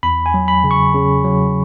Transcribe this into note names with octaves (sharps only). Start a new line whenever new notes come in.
E2 B5
G#5
F#3
B5
C#3
C#6
C#3
F#3